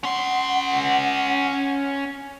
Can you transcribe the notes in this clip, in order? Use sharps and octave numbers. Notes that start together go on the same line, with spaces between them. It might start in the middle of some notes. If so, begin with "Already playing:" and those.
C#4 F#5 C6